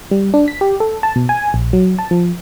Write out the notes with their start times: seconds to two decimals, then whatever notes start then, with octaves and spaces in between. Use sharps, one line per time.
0.11 G3
0.34 D4
0.48 B6
0.61 G4
0.80 A4
1.03 A5
1.16 B2
1.29 G#5
1.54 A#1
1.73 F#3
1.99 A5
2.11 F3